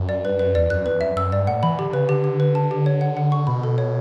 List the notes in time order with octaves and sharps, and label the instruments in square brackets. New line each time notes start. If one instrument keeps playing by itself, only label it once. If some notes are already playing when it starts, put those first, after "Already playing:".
Already playing: [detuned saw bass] F#2
[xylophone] D5
[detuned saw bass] G2 [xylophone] B4
[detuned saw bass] F#2 [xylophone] B4
[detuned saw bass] E2 [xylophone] D5
[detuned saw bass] F#2 [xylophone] F#6
[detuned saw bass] E2 [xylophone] B4
[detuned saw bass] F#2 [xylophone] E5
[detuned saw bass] F#2 [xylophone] E6
[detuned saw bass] G2 [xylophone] D5
[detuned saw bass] A2 [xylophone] F#5
[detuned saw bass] E3 [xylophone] B5
[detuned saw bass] D3 [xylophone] G4
[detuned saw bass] D3
[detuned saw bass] C#3 [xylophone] B4
[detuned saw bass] D3 [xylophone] G4
[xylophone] G4
B4
A5
G4
C#5
F#5
F#5
C#6
[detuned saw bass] B2 [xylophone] B5
[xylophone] A4
C#5